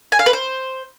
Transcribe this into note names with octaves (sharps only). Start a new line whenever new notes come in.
G#5
F5
B4
C5